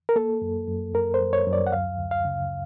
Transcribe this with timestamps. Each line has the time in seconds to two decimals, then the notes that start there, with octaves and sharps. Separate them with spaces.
0.09 A#4
0.16 A#3 A4
0.42 F#2
0.68 F#2
0.94 F#2 A#4
1.14 C5
1.20 F#2
1.33 C#5
1.46 F#2
1.53 D5
1.67 F#5
1.72 D2 F5
1.99 D2
2.11 F5
2.25 C#3